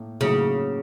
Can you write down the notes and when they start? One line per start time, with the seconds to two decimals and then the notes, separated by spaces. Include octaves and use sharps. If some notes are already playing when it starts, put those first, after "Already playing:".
Already playing: A2 A#3
0.21 A2 C#3 F#3 A#3